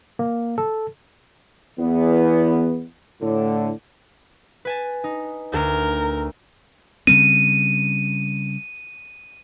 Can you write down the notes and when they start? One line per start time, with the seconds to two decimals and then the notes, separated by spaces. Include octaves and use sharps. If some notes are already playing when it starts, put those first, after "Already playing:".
0.19 A#3
0.58 A4
1.79 E2 B3
3.21 A2 D3
4.65 B4 G#5 A5
5.04 D#4
5.53 D2 A#4
7.07 C#3 G3 C4 D#7